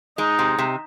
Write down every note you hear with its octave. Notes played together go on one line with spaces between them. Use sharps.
G#3 D#4
C3
C3